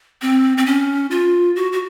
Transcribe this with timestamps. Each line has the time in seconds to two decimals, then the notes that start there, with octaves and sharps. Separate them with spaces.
0.22 C4
0.58 C4
0.66 C#4
1.11 F4
1.56 F#4
1.73 F#4